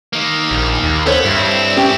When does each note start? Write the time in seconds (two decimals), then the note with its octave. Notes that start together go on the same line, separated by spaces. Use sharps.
0.13 D#3 A#3
0.51 A#1
0.83 D#2
1.06 B3 A4 C5 C#5
1.25 G2 C4 E4
1.77 C#4 G4